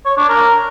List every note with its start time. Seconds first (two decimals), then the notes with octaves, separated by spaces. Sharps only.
0.06 C#5
0.17 D4
0.29 A#4